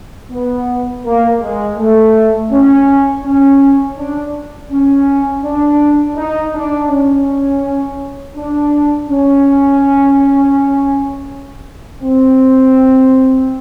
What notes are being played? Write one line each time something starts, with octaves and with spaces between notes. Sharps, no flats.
B3
A#3
G#3
A3
C#4
C#4
D4
C#4
D4
D#4
D4
C#4
D4
C#4
C4